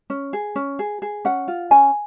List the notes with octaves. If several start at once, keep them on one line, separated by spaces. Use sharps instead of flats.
C#4
G#4
C#4
G#4
G#4
C#4 F#5
F4
C#4 G#5